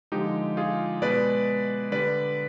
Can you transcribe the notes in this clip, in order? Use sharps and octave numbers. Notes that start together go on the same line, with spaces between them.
D3 F3 G#3 D#4 G4
F4 G#4
B2 G#3 B4 D5
D3 G3 B4 D5